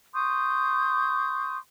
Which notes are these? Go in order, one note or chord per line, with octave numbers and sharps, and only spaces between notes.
C6 C#6 D#6 G6